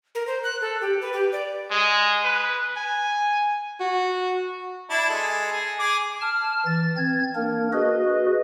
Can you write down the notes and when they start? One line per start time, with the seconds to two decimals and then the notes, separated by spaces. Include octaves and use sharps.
0.15 A#4
0.27 C5
0.44 F#6
0.61 A4
0.81 G4
1.01 B4
1.13 G4
1.32 D5
1.71 G#3
2.24 B4
2.77 G#5
3.80 F#4
4.90 D4 E4 A5
5.09 G#3 A4
5.52 G#4
5.79 G#4 D6
6.21 A5 F6
6.65 E3 A6
6.97 C4 G#6
7.35 A#3 D4 A#4
7.73 F#4 G#4 B4 D#5